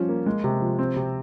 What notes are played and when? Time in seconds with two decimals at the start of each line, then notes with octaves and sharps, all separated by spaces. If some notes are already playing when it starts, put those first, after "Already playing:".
Already playing: F3 G3 C#4
0.09 A#3
0.26 G#3
0.44 C3
0.61 F3
0.79 C4
0.96 C3